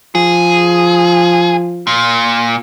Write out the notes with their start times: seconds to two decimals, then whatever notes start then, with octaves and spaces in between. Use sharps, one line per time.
0.15 F3 G#4
1.87 A#2